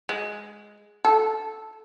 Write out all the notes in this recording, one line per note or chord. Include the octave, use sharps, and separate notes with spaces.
G#3
A4